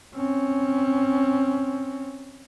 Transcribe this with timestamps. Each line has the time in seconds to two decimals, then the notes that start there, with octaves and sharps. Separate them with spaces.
0.15 C4 C#4